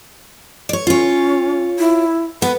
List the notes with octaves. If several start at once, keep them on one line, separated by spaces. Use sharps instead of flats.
C#5 D5
C#4 F4 C#5
E4
B3 B4